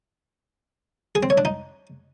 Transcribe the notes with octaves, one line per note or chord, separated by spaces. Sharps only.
G#4
C4
C#5
D4
D#4